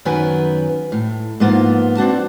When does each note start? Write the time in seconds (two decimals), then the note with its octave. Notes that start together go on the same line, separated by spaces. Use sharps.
0.05 F#2 D#3 F#3 B3 B4 G#5
0.92 A2
1.40 G#2 F3 A#3 B3 F4
1.97 C4 D4 F#4 A5